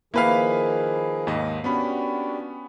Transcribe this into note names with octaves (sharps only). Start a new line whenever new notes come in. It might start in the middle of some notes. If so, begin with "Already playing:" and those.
D#3 F3 A#3 E4 G#4 B4 F5
D#2 G#2 D#5
B3 C#4 D4 F#4 G4 B5